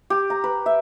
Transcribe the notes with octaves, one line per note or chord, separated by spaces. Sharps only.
G4
A#5
B4
E5